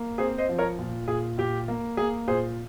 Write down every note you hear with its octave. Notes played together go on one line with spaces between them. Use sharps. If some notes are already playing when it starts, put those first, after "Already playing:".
Already playing: A#3
C4 G#4 C5
C5 D#5
F3
A#4 C#5
A#2
A#2 G#4
A#2 G4
A#3
A#3 G#4
A#2 G#4 C5